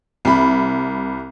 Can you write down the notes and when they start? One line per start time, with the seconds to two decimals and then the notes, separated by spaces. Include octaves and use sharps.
0.25 C2 B5